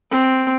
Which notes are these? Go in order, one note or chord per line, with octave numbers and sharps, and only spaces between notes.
C4